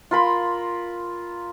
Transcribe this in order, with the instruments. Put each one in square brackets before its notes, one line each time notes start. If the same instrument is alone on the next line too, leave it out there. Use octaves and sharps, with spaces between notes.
[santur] F4 A#4 B5 C6